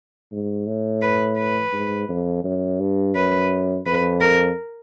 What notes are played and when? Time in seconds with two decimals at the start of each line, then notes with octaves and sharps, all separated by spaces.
0.32 G#2
0.67 A2
1.02 B4
1.38 B4
1.73 G#2
2.09 F2
2.44 F#2
2.79 G2
3.15 F#2 B4
3.86 F2 B4
4.21 A#4